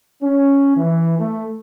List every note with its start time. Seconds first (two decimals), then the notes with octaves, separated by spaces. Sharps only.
0.22 C#4
0.77 E3
1.19 A3